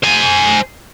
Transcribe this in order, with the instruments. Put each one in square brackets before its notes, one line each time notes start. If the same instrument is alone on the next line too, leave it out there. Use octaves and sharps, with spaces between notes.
[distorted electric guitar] C5 G#5